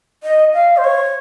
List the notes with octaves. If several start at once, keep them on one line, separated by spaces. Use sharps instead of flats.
D#5
F5
C5
C#5